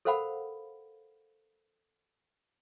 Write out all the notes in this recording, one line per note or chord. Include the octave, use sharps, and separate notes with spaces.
A4 A#4 C5 F5 F#5 B5